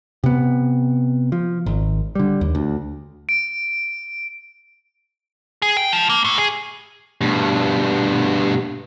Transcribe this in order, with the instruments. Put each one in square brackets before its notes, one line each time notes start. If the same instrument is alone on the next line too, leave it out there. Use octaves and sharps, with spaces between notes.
[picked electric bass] C3 B3
F3
G#1
D3 G3
D#2
D2
[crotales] D7
[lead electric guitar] G#4
G5
F3
A#3
A2
G#4
G2 B2